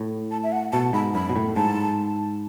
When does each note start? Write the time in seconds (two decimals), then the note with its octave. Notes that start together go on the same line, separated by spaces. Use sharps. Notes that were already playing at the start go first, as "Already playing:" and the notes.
Already playing: A2
0.31 A5
0.43 E5
0.52 F#5
0.72 B2 A5
0.93 G#2 B5
1.15 F#2 B5
1.29 B2
1.36 A2
1.56 G#2 A5